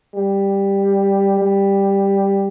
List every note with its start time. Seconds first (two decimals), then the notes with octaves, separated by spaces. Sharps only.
0.15 G3
1.39 G3